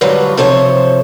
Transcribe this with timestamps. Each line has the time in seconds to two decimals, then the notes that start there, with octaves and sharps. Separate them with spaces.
0.01 G#2 D3 F#3 G3 F4 B4
0.37 C3 F3 A4 C5 C#5